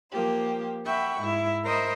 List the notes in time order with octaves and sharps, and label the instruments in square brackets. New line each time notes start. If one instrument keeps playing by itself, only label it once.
[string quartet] F3 A#3 G4 C5
E5 F#5 G5 B5 C#6
G#2 E4 E5
A#4 C5 D#5 E5 B5